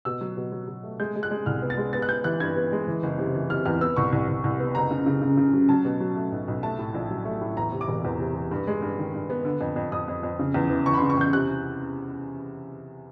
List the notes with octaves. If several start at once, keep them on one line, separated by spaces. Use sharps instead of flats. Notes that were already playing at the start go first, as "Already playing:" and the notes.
B2 E6
F#3
B2
F#3
F#3
A3
G#3 G6
G#3
F#6
G#3
C2 F6
B3
A6
G#3
B3 A6
F#6
B3 G6
E3 F#6
G2 G#6
B3
G#3
E3
F#1
C3
E3
C3 F6
E2 F6
B3 E6
C2 C#6
C2
C2
C2
B3
F#1 A#5
C#3
C#3
C#3
C#3
F#3
F#3 A5
B2
F#3
A3
B1
B1
A3 A5
A2
A#1
F#3
A3
A2
E2 A#5
C3
D6
E1
E2
C3
C3
G2
G#3
G2
D#3
G2
B3
D3
F2
F2
F2 D#6
F2
F2
C#3
E2
E3
E3 C#6
B5
C#3 C6
C#6
E2 G6
C3 F#6